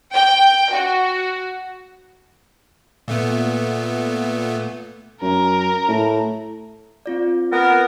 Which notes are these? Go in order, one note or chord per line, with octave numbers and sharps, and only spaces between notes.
G5
F#4
A#2 A3 B3
F#2 A#4
A2
C4 F4 D5
B3 A#4